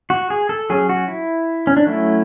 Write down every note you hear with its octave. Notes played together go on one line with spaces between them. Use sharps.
F#4
G#4
A4
F#3 C#4 G#4
F#4
E4
C#4
D4
F#3 A3 C#4 E4